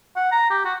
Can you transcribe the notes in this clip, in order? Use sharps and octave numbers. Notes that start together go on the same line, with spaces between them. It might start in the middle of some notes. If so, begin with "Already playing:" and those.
F#5
A#5
G4
F#4